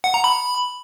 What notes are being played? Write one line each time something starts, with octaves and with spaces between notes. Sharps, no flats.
F#5
A#5
B5